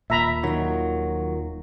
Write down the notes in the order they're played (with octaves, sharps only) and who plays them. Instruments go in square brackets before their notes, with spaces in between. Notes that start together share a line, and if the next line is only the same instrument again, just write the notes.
[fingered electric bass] D#1 A#2 [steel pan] E5 A#5 B5
[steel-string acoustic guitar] D#3 F4 [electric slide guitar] F#3